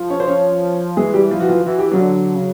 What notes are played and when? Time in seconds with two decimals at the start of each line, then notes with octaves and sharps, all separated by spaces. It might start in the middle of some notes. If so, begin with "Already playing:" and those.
Already playing: F3
0.10 C#4 C#5
0.20 C5
0.27 C#4 C#5
0.97 E3 G#3 G#4
1.14 G3 G4
1.31 F3 F4
1.40 F#4
1.49 F3 F4
1.65 E3 F#4
1.79 G4
1.91 C#3 F#3 F#4
2.00 D3
2.35 C#3